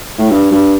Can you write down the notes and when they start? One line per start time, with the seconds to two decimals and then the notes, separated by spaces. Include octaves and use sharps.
0.18 A2
0.30 G2
0.51 G2